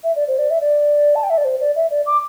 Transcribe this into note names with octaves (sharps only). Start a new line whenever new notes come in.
E5
D5
C5
D5
E5
D5
A5
G5
E5
D5
C5
D5
E5
D5
D6